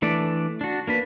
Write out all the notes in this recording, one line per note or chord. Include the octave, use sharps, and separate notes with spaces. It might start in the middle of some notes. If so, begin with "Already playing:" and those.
E3 A3 D4 D5
D4 F#4
A#3 D4 B4